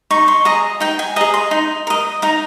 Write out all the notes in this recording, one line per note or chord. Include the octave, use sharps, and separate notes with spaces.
D#4 C#6
C6
G#4 D#5 A#5
D#4 G5
G#5
G#4 D#5 A#5
C6
D#4
A#4 D#5
D#4 A#5